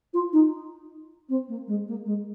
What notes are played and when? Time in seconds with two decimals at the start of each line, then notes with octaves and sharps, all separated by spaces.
0.13 F4
0.32 D#4
1.28 C4
1.48 A#3
1.67 G#3
1.87 A#3
2.05 G#3